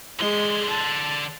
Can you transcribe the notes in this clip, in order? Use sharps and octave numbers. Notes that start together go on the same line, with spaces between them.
D3 G#3 C6
A5